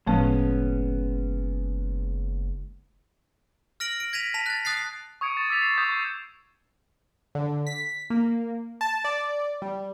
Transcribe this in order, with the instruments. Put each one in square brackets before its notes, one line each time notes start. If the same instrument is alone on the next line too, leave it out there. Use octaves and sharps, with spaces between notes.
[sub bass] F#1 [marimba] A2 F3 A3 [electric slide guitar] G#3 B3 C#4
[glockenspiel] F6 A#6 D7 F#7
D7
G#6 A#6 B6 D#7 F7
A5 B6 F7
F#6 A6
D#6 F#6 A6 C7
[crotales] C#6 D#6 G#6 C#7 D7
A6 E7
D6 E6 A6 B6 F7
B6 C7 E7
C#6 D#6 G6 G#6 B6 E7
G6 C7 E7
[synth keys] D3
B6
A#3
A5
D5
G3